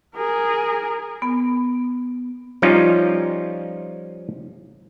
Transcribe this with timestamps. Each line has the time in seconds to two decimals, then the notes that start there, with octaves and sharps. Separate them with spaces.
0.16 G#4 A#4
1.22 B3
2.62 F3 G3 C#4 D#4 F4